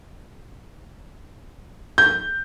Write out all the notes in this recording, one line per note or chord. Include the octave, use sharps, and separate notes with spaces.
G6